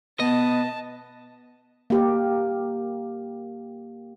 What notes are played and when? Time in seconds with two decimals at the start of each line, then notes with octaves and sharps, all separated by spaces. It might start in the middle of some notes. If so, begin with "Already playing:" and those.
0.20 B2 B3 D#5 A5
1.90 A#3 G4